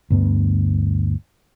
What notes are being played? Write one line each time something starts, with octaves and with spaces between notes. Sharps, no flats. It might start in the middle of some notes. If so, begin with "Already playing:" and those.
D2 G2 B3